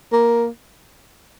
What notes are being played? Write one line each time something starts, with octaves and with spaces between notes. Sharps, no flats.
A#3